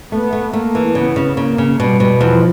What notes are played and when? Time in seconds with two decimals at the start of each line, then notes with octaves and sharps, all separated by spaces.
0.12 A3 B3
0.33 A3
0.53 A3 A#3
0.75 E3
0.95 C#3 B3
1.16 C#3
1.37 C#3 A#3
1.58 C#3
1.79 B2 G3
2.00 B2
2.21 E2 F3